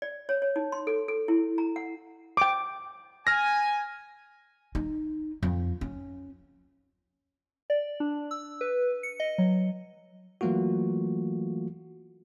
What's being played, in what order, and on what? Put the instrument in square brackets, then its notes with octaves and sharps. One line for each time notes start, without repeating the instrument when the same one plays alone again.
[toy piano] D5
C#5
C#5
D#4
C6
A4
A4
E4
A#5
F#5
[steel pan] G5 D6
[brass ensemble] G#5 [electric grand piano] F6 A#6
[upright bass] D#4
F2
C#4
[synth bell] D5
D4
E6
B4
C#7
D#5
F#3
[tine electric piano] E3 F#3 A3 A#3 F4 F#4